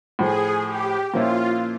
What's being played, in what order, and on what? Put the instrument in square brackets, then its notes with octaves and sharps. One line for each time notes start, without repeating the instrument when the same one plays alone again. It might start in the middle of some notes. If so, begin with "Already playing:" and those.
[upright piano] A2 F3 A3 [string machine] G#4
[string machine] G4
[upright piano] A#2 F3 A#3 C#4 E4 [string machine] F4